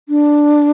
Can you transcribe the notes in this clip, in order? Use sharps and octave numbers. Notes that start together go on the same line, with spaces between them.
D4